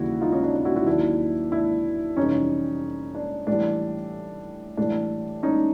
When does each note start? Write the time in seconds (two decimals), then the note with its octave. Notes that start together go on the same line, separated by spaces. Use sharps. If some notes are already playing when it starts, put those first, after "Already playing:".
Already playing: D#2 C#3 E3 G3 E4 F#4
0.21 D#4 F4
0.32 C#4 D#4
0.43 D4
0.54 D4
0.65 E4 F#4
0.75 E4 F#4
0.86 D#2 D#3 F#3 D4 E4
1.52 D4 E4
2.17 F2 C3 E3 G3 C#4 D#4
3.15 D4
3.47 A2 E3 G3 D4
4.77 A2 E3 G3 D4
5.43 C#4 D#4